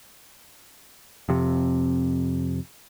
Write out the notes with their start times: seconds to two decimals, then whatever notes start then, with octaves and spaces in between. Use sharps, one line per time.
1.29 F2 C3